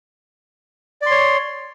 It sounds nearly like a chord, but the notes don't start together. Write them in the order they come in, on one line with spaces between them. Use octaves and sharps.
D5 C6 C#5